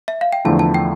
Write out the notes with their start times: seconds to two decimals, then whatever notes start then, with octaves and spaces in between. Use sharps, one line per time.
0.08 E5
0.21 F5
0.33 G5
0.45 E2 D3 F3 A3 E4 A5
0.59 A5
0.74 G5